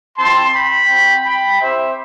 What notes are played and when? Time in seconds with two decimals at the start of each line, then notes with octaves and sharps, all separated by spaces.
0.17 C4 E4 G4 A5 C6
0.54 G5 B5
0.90 C4 F#4
1.26 G5 B5
1.61 C4 E4 G4 C5 E5